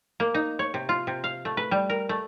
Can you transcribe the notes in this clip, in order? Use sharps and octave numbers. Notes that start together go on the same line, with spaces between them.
A#3
D#4
C#5
C3
F4
C3
F5
A3
B4
G3
A#4
A3